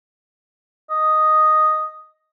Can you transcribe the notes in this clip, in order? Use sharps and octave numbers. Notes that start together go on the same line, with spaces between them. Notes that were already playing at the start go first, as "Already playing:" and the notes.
D#5